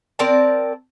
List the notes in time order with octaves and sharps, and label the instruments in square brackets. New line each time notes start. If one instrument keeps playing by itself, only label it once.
[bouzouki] C4 A#4 D5 A5